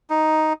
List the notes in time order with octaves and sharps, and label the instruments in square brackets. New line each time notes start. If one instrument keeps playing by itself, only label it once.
[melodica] D#4